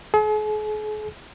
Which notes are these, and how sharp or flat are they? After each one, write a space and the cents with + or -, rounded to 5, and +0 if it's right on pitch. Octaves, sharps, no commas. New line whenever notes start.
G#4 +45